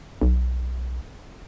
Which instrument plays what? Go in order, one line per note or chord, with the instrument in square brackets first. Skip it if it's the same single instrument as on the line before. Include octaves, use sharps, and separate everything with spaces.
[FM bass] B1